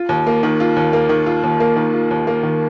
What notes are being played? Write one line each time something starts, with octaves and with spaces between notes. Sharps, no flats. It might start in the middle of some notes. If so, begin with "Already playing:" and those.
Already playing: F4
D#2
A#3
D#3
F4
D#2
A#3
D#3
F4
D#2
A#3
D#3
F4
D#2
A#3
D#3